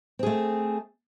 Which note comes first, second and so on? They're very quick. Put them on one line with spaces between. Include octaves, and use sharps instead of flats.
C4 G#4 A3